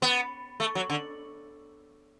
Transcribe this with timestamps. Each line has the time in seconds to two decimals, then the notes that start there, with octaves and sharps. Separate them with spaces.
0.02 B3
0.60 A3
0.75 F#3
0.90 D3